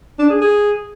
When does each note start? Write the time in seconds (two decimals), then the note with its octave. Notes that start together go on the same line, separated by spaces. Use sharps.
0.19 D4
0.30 G#4
0.41 G#4